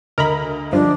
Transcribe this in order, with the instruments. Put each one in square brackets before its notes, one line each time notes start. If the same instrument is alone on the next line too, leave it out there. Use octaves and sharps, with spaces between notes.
[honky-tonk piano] D2 D#5 [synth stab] A#4 A#5 B5
[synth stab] G2 F3 [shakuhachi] D4